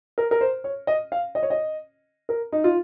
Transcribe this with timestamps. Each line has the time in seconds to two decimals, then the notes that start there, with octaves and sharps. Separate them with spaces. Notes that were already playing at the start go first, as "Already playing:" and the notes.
0.18 A#4
0.31 A#4
0.41 C5
0.64 C#5
0.87 D#5
1.12 F5
1.35 D#5
1.43 C#5
1.50 D#5
2.29 A#4
2.52 D#4
2.64 F4